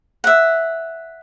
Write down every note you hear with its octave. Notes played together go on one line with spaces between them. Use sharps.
E5 F#5